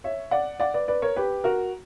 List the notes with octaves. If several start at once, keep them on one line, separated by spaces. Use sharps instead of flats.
C#5 E5
D5 F#5
D5 F#5
B4 D5
B4 D5
A#4 C#5
G4 B4
F#4 A#4